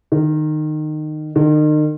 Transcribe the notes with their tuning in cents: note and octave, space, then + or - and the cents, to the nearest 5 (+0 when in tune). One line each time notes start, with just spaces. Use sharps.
D#3 -20
D#3 -35